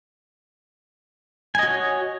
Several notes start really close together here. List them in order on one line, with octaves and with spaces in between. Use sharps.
G#5 D#5 F#4 C#5